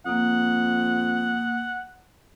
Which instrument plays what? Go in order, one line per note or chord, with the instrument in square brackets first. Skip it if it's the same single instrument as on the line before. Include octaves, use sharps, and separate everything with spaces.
[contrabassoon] F2 [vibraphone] A#3 D#6 [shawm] F#5